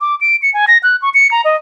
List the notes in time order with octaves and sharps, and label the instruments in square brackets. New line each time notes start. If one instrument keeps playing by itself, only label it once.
[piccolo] D6
D7
C#7
G#5
A#6
F#6
C#6
C#7
A#5
D#5